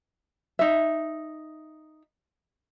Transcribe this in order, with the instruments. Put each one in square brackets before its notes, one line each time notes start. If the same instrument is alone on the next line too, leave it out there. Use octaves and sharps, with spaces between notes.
[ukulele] D#4 E5